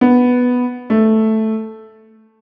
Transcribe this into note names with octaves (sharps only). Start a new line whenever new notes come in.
B3
A3